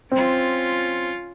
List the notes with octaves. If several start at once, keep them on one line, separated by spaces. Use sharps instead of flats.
C4 C#4 F4